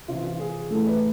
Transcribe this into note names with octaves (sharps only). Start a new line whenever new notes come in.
C3 E3 F4
F4
G#4
A2 E3 A4
B4